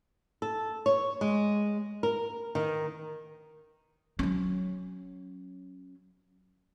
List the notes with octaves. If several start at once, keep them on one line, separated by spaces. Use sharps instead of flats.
A4
C#5
G#3
A#4
D#3
F#3 C#4